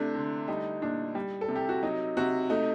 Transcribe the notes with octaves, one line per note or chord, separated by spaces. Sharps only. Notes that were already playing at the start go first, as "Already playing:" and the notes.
Already playing: C3 A3 D4
D3
G3 D#4
A#2 D4
G3
A4
C3
G4
F#4
F#3 D#4
C3 F#4
A3 D#4